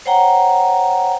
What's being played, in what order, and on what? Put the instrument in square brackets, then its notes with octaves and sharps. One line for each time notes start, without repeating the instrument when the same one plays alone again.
[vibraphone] C5 C#5 F#5 G5 A#5